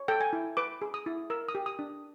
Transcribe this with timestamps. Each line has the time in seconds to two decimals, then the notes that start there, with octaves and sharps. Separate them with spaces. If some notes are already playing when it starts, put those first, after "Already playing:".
Already playing: C#5
0.08 A4 G5
0.20 G#5
0.33 E4
0.57 B4 D6
0.82 G#4
0.94 D#6
1.06 E4
1.30 A#4 E6
1.49 D#6
1.55 G4
1.66 D#6
1.79 D4